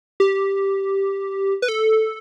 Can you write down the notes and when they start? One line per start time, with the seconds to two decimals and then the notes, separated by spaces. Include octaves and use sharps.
0.20 G4
1.62 B4
1.68 A4